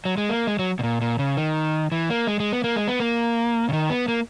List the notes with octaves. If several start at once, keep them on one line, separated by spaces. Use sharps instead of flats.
F#3
G#3
A#3
G#3
F#3
B2
A#2
A#2
C#3
D#3
E3
A#3
G#3
G#3
B3
A#3
G#3
B3
A#3
C#3
D#3
B3
A#3